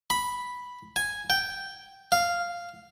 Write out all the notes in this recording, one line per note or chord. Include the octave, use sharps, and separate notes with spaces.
B5
G#5
G5
F5